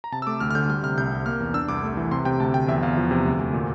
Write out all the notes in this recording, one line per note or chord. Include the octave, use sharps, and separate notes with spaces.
A#5
C3 A5
E6
A3 D6
D2 F6
F6
D3 G6
G3 F6
C3 F6
C2 G6
C4
A#3 F6
E2
D4 E6
C2 D6
A3
E3
C3 C6
C3 G5
D2 A5
D2 G5
E2 E5
E2 F5
F3
C3
D2
D2
A#2